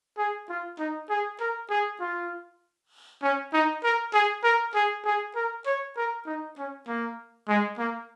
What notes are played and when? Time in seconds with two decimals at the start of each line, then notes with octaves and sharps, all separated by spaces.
0.18 G#4
0.49 F4
0.79 D#4
1.10 G#4
1.40 A#4
1.70 G#4
2.00 F4
3.22 C#4
3.53 D#4
3.83 A#4
4.13 G#4
4.43 A#4
4.74 G#4
5.05 G#4
5.35 A#4
5.66 C#5
5.97 A#4
6.26 D#4
6.58 C#4
6.88 A#3
7.48 G#3
7.78 A#3